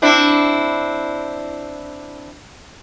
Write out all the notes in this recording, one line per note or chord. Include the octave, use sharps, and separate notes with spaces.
C4 D4 E4